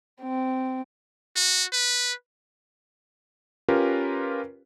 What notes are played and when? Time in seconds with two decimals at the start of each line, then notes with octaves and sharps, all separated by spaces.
0.22 C4
1.36 F#4
1.72 B4
3.68 C#4 F4 G4 A#4 B4